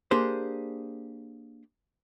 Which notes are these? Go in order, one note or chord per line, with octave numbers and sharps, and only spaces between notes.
A#3 D4 G4 G#4 C5